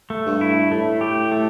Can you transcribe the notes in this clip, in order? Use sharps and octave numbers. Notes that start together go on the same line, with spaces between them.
A3
G2
E4
A2 A3
G4
A3